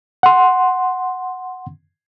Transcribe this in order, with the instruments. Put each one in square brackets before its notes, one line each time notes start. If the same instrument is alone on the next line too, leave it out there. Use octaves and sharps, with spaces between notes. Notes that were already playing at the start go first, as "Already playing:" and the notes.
[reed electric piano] F#5 C6